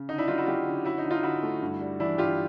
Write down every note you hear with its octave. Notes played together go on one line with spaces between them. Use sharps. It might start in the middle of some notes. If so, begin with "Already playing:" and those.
Already playing: C#3
D3 D#4
D4 E4
F#3 D#4 F4
E4 F#4
F#3 F4 G4
D3
C#4 E4 F#4
D#4
D3
D#4 F4
D3 E4 F#4
A3
G2
G3
E3 D4 E4
G2 F4 G4